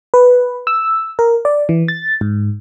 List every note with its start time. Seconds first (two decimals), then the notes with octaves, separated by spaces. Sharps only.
0.14 B4
0.67 E6
1.19 A#4
1.45 D5
1.69 E3
1.88 A6
2.21 G#2